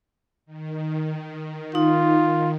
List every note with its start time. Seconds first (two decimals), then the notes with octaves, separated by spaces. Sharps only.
0.46 D#3
1.75 D#4 F4